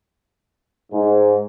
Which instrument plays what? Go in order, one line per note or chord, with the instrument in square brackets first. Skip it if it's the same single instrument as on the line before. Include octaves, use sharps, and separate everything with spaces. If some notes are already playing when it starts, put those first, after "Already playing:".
[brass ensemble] G#2